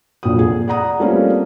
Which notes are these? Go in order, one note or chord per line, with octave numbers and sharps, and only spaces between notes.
F1 A#1 A#2 F3 F#3 D#6
G#4
D5 F#5 A#5 D#6
G3 A3 A#3 C4 C#4 F4